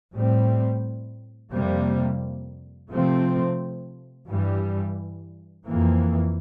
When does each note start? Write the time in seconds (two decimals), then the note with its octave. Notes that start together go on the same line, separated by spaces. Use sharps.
0.14 A2 G3 C4
1.52 F2 C3 G3 A#3
2.90 C3 F3 A3 C4
4.29 G2 E3 G3
5.67 F2 E3 A#3